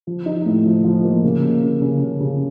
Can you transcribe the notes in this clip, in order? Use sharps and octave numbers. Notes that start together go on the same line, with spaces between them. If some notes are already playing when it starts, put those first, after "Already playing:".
F3
D#4
A2
F3
F3
A#3
C#3
A#3
C#3
C#3
C#3
C#3